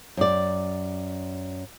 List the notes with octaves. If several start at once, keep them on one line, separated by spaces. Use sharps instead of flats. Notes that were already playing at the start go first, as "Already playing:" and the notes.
F#2 D5